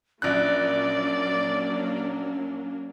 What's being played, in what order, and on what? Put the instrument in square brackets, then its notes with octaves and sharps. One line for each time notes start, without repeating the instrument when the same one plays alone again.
[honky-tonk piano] A#1 F#6 [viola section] F#3 A#3 D4 [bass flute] C#4 [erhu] D5